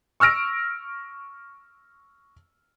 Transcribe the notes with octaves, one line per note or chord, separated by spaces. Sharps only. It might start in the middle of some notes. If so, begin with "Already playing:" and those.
C#6 E6 F6 A#6 D7